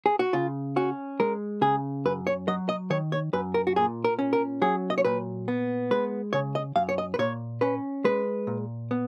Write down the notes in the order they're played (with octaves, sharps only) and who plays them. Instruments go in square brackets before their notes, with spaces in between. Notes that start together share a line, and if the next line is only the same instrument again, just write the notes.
[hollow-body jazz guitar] G#4
F#4
C#3 F4
C#4 F#4
G#3 A#4
C#3 G#4
F#2 B4
C#5
F#3 D#5
D#5
D#3 C#5
C#5
F#2 B4
A#4
F#4
A#2 G#4
A#4
C#4
A#4
F#3 G#4
D#5
C#5
A#2 B4
B3
G#3 B4
C#3 C#5
D#5
F#2 F5
C#5
D#5
B4
A#2 C#5
C#4 B4
G#3 B4
A#2
B3